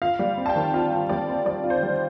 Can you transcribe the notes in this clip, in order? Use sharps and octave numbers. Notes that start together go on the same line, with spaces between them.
F4 F5
G3
C4
A5
G5
D#3
F4 F5
F4
G3 D5
C4
G3 D5
F4
C5
G3